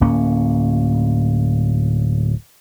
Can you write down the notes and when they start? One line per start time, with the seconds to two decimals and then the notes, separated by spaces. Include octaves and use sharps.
0.01 D1 A#3 C#4